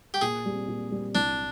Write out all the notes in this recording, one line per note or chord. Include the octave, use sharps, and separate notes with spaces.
G4
A#2 G#4
G3 C4
A#2
G3 C4
C2 D4